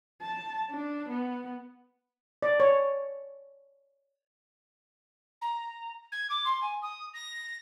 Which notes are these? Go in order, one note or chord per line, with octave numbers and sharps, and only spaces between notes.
A5
D4
B3
D5
C#5
A#5
G#6
D6
C6
G#5
D#6
A#6